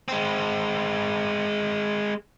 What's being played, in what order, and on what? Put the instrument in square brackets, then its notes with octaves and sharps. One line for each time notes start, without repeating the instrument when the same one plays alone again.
[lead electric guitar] G#3 C4